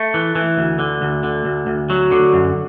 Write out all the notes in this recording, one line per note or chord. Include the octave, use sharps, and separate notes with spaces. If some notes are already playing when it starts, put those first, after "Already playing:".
Already playing: A3
E3
E3
D2
D3
D2
D3
D2
D2
F#3
D3
F#2